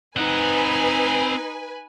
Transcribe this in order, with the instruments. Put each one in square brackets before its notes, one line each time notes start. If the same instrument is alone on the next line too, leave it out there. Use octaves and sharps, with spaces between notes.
[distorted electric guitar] C4 F#5 [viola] D#4 [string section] B4 G#5